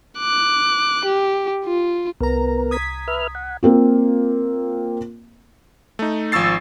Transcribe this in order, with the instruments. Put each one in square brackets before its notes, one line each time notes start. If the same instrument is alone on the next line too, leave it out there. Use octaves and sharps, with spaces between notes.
[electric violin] D6 F#6
G4
F4
[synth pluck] C2 A#5 [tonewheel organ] B3 A#4
[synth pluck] D#6 G#6 B6
[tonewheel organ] B4 E5 F6
F#5
[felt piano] A#3 C4 F4
[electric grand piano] A3 D#4
G#1 F3 C#6 E6 A6 C7